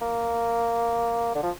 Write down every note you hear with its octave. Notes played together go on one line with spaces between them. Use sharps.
A#3
D3
F3